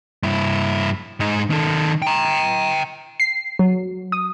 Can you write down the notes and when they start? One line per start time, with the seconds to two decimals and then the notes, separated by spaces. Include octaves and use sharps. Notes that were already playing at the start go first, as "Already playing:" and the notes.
0.23 G2 E4
1.20 G#2 D#4
1.50 D#3 A4
2.02 G5 A#5
3.20 C7
3.59 F#3
4.12 D#6